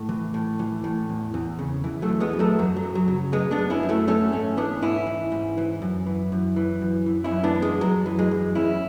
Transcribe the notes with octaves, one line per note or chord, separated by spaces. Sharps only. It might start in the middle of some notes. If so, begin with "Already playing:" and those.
Already playing: A2 A3
E3
A2
E3
A2
E2
E2
C#3
E3
F#3 A3
E2
G#3 B3
E2
F#3 A3
F#2 F#3
F#3
F#2
F#3
C#3
F#3 G#3 B3
B3 D4
F#2
C#4 E4
F#2
F#3 A3
E3 A3 C#4
G#2 A3 C#4
E3 B3 D4
G#2 C#4 E4
E3
G#2
E3
F#2
E3
F#2
E3
F#2
E3
C#4 E4
F#2
B3 D4
E3
G#3
F#2 F#3
E3
G#3
F#2
E2 C#4 E4